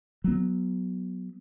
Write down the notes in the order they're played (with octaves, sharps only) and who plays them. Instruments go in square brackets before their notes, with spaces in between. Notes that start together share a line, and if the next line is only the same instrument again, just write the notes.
[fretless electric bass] F#3 B3